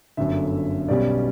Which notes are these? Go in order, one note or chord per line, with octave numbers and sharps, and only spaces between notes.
G1 F#2 D3 E5
B1 B2 G3 C#4 D5